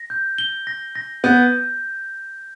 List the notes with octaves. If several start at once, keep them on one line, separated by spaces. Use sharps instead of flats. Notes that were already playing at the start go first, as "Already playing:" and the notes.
Already playing: A#6
G6
G7
A#6
A#6
B3 G6